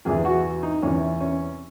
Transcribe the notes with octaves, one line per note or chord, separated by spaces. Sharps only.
E2 C3 E3 G#4
F#4
D#4
E2 C3 E3 C#4
C#4